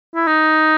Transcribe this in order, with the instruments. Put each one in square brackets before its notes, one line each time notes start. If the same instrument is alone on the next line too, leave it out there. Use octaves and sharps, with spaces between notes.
[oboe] E4
D#4